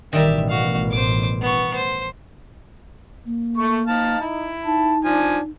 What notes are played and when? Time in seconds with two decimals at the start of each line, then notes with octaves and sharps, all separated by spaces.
0.13 A1 B2 D#3 G3 G4 A#4 E5
0.49 F#4 F5
0.91 C5 D6
1.41 B3 C#6
1.75 C5
3.26 A#3
3.57 A3 C#6
3.87 D#4 F5 A5
4.21 E4
4.65 D#4 A5
5.05 F3 D4 G#5